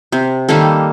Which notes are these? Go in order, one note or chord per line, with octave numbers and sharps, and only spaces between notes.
C3
D#3 G3 A#3 A4